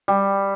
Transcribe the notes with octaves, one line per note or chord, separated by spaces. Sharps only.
G3